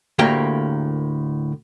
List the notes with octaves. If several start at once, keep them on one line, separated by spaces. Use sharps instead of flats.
D2 A2 A#3 G4 A#4 G5